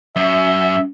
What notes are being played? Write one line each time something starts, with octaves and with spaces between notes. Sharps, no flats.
F#2 E5